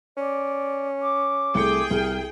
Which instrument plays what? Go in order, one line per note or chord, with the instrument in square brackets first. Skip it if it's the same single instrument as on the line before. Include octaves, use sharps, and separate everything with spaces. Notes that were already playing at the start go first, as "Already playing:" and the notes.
[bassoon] C#4 [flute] D5
[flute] D6
[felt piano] C2 A3 C#7 [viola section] G#4 G5
[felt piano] C2 [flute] F6